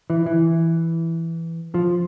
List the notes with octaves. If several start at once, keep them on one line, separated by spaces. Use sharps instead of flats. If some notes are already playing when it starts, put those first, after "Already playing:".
E3
E3
F3